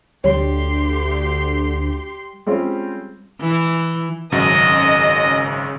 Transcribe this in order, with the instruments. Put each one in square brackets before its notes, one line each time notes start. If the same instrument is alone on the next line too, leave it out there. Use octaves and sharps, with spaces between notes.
[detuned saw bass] D2 [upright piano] G3 [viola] G4 C6 [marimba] C#5
[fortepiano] G3 G#3 C4 C#4 F4
[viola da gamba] E3
[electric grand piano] G#1 F#2 F#4 [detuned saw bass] C#3 [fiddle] D#5